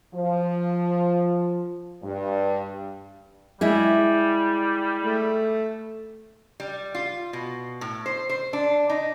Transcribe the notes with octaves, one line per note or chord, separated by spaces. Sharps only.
F3
G2
G3 G#3 E4
A3
G3
F4
B2
A2
C5
C5
D4
D#4